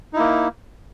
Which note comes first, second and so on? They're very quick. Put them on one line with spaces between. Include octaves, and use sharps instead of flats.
D#4 E4 A#3